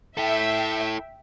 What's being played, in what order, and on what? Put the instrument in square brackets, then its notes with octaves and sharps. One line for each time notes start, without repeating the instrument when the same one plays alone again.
[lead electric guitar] E4 A4 [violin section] E5 G5